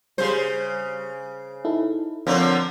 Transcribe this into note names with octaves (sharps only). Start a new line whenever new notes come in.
C#3 G3 C5
D#4 E4 A4
D3 F3 A#3 C4 C#5